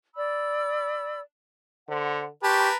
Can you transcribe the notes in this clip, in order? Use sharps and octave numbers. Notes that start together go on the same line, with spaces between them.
D5 B5 E6
D3 C5 F#5
G4 A#4 B4 A5 A#5 C6 C#6